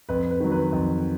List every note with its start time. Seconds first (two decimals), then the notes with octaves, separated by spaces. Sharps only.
0.09 F2 B4
0.31 B4
0.40 D#3 F#3
0.52 B4
0.73 F2